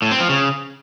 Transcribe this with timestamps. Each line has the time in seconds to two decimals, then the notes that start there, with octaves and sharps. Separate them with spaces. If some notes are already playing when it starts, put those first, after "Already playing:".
0.02 A2
0.11 C4
0.20 F3
0.29 C#3